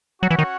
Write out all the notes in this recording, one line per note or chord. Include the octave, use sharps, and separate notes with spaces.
F#3 C#4 F#4 C#5 F#5
E3
D#3